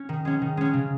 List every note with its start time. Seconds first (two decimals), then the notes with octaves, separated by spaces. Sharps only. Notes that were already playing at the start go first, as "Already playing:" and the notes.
Already playing: C#4
0.09 D#3
0.25 G#3 C#4
0.42 D#3
0.57 G#3 C#4
0.74 C#3